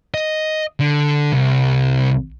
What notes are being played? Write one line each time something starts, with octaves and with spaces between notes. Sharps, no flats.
D#5
D3
C2